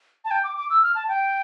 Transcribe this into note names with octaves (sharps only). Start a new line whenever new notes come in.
A5
G5
D6
D6
E6
F6
A5
G5